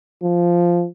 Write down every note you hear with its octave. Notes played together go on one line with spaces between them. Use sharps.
F3